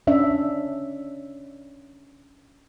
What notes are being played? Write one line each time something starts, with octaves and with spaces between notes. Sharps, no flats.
C#4 D4 E5